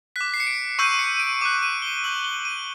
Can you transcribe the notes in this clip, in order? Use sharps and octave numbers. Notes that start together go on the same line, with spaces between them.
D6 F#6 B6
C7
C#7
D7
C#6 E6 G6 D#7
C#7
D7
D6 F#6 D#7
D#7
G7
C#6 E6 G6 F#7
G7
D#7